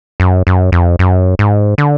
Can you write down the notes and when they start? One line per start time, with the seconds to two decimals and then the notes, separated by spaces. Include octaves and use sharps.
0.20 F#2
0.47 F#2
0.72 F2
0.99 F#2
1.39 G#2
1.78 D3